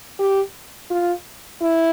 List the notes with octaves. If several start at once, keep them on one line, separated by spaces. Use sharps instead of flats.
G4
F4
E4